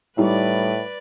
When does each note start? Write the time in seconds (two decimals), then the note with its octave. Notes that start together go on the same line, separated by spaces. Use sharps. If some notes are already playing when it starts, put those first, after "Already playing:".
0.18 A2 G3 D#4 E4 B4 D5